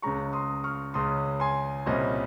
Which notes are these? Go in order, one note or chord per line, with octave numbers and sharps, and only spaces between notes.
C#2 C#3 G#3 C#4 A#5 C#6
C6 D#6
C#6 F6
C#2 C#3 G#3 C#4 C6 D#6
G#5 C6
C2 A#2 G3 C#4 C5 D#5